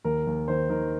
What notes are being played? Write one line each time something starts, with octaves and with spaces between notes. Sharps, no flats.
D#2 A#4
D#2
D#3 C5
D#3 A#4